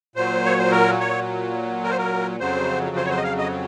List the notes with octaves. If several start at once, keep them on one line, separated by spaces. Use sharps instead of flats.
A#2 F#3 C5
C#5
C5
A#4
C#5
A#4
C5
A#4
F2 C#3 F#3 C5
C5
C#5
C5
D#5
F5
D#5